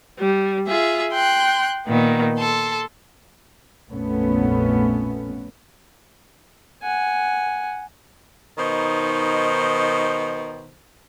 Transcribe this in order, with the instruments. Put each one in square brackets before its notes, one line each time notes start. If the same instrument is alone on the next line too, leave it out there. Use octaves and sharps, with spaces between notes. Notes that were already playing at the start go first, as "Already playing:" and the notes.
[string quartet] G3
F4 G#4 E5
G5 C6 F#6
A#2 D#3 B3
A4 C6
[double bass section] A#1 F2 A3 B3 C#4
[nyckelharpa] F#5 G#5
[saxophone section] B2 D#3 D#4 C5